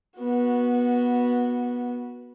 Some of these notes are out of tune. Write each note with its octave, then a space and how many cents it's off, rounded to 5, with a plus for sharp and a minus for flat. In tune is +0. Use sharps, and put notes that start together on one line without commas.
B3 -20 F#4 -5